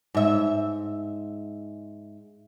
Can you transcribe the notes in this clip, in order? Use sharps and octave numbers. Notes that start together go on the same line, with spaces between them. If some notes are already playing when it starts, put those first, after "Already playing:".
G#2 E5